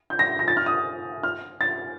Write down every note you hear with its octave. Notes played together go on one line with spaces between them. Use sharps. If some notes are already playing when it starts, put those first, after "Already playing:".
G6
A#6
A#6
A6
F6
D#6
F6
A6